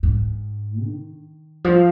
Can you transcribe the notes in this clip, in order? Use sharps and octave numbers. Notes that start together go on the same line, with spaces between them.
G#2
D#3
F3